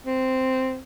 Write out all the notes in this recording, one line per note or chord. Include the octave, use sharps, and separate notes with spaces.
C4